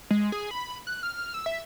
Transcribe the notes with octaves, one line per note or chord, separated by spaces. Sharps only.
G#3
G#4
B5
F#6
F6
E6
E5